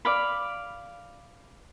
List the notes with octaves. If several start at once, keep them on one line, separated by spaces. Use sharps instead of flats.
D5 F5 B5